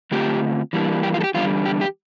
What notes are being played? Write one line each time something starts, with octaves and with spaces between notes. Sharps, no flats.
D3 A3 C4 F4 G4
E3 G3 A#3 D4
G4
F4
A4
G4
E2 D3 G3 D4 F4
G4
G4